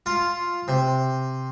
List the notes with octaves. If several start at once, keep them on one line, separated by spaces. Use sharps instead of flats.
F4
C3